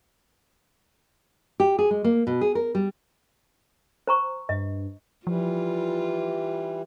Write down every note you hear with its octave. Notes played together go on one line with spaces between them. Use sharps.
G4
G#4
G#3
A#3
B2
G#4
A#4
G3
C5 A#5 C#6
G2 D#5
E3 F3 G3 F4